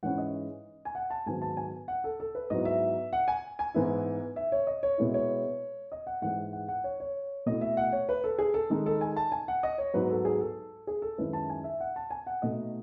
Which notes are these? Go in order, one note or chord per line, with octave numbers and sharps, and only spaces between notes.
G#2 E3 G#3 C#4 E4 F#5
D#5
G#5
F#5
A5
G#2 D#3 F#3 B3 G#5
A5
G#5
F#5
A4
A4
B4
G#2 F#3 B3 E4 D#5
E5
F#5
G#5
G#5
G#2 E3 B3 E4
E5
C#5
D#5
C#5
B2 G#3 B3 E4
C#5
D#5
F#5
G#2 E3 G#3 F#5
F#5
F#5
C#5
C#5
B2 A3 E4 D#5
E5
F#5
C#5
B4
A4
G#4
A4
D#3 G#3 D#4
A4
G#5
A5
G#5
F#5
D#5
C#5
G#2 F#3 B3 B4
A4
G#4
A4
G#4
A4
F#2 D#3 G#3 C#4 E4 B4
A5
G#5
E5
F#5
A5
G#5
F#5
B2 A3 D#4 D#5